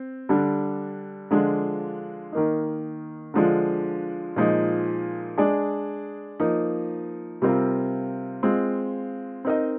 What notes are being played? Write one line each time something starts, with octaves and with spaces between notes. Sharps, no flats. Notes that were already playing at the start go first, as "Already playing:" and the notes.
Already playing: C4
D3 G3 D4
D3 F3 G#3 D4 F4
D#3 A#3 D#4
D3 F3 G#3 D4 F4
A#2 F3 G#3 D#4
G#3 D4 G#4 D5
F3 A#3 D#4
C3 G3 C4 F4 A#4
G#3 C4 F4
C4 D#4 A#4 D#5